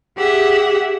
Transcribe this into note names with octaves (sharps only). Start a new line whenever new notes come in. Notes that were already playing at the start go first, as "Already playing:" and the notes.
G4 G#4 E5 F#5